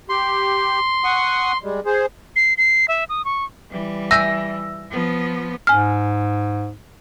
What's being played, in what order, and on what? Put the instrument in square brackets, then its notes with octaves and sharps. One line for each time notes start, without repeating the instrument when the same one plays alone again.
[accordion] G4 [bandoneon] C6
[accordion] F#5 C#6 D#6
G3 G#3
G#4 C5
[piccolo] C7
C7
E5
D#6
C#6
[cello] E3 G3
[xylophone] E5 G#5 G6 [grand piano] E6 A#6
[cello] F3 B3
[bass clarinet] G#2 [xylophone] G#5 F6